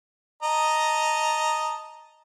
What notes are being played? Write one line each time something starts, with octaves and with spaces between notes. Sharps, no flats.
D#5 A5 A#5